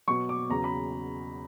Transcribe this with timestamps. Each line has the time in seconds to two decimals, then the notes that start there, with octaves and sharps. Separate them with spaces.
0.08 B2 F#3 C#6
0.29 D6
0.50 E2 C#3 F#3 A#5
0.64 B5